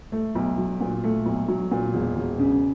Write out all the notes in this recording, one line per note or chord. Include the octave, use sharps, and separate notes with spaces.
A3
B1
F#3
A#2
A3
B1
F#3
A#2
E1
E1
C#3